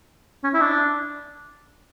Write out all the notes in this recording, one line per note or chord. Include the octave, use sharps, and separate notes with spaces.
C#4
E4
D4